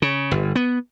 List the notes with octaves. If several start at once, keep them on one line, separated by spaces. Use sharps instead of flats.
C#3
G1
B3